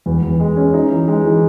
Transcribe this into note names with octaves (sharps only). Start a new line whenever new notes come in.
E2
E2
G#3
C#4
D#4
E3
G#3
E3